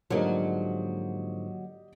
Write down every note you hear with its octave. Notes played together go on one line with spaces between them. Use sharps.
G#2 D3 F3 F#3 A#3 G4 D5 D#5